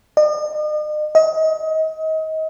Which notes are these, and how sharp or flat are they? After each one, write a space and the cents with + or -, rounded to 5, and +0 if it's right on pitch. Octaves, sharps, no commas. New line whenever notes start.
D#5 -45
D#5 +30